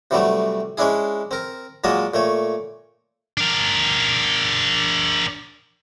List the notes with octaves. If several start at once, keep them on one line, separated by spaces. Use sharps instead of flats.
C3 E3 F#3 G3 A3
G#3 C#4 D4 E4 G#4
C4 A#4
A#2 F#3 G#3 A#3 D#5 A5
A#2 A3 C#5
D4 A#4